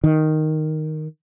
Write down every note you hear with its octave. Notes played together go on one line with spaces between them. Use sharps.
D#3